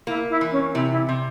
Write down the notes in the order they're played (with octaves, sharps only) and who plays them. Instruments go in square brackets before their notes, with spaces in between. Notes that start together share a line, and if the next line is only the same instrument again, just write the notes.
[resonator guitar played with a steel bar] A#3 [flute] E4
[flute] E4
[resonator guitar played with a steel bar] E3
[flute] C#4
[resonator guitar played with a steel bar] C3 [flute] E4
[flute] E4
[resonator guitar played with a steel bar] C3